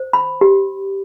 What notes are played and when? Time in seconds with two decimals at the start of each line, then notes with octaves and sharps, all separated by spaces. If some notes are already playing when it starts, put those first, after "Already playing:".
Already playing: C5
0.13 B5
0.41 G4